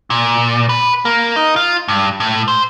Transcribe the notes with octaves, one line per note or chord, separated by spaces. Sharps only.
A#2
B4
A#3
D#4
F4
G2
A2
C5